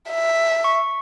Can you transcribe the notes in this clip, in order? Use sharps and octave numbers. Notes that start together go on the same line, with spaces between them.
E5
C#6